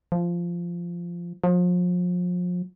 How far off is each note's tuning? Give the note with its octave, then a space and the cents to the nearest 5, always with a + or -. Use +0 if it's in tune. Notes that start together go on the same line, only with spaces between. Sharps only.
F3 -10
F3 +35